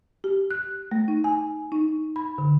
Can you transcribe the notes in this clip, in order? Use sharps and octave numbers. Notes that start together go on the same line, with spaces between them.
G4
F#6
A3
D#4
G#5
D#4
B5
D3